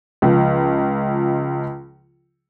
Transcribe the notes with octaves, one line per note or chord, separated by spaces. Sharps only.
C#2 F3